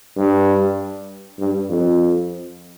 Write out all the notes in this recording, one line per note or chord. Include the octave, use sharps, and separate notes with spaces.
G2
G2
F2